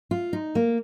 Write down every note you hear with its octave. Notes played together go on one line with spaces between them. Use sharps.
F4
D#4
A#3